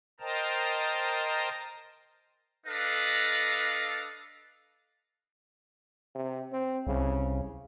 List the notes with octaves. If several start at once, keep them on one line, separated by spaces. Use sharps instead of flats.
A#4 C5 D#5 G5 A5 A#5
D4 A4 B4 D#5 F5
C3
C4
C2 C#3